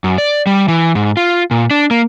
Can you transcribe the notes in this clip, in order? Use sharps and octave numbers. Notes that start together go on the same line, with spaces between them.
F#2
D5
G3
E3
G#2
F4
A#2
D4
A#3